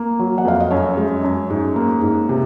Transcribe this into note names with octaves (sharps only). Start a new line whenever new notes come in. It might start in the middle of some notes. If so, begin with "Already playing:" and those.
Already playing: A#3
F#3
F#5
F2 F5
D#5
F#2 C#5
G#3
F#2
G#2
A#3
G#2
C3